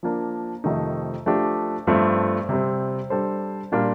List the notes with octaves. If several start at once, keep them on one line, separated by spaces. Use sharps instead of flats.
F3 A#3 D4
F2 C3 D#3 A3 D#4
F3 A3 D4 G4
G2 F3 A3 C4
C3 G3 C4
G3 D4 A4 C5
A#2 G3 A#3 D4 F4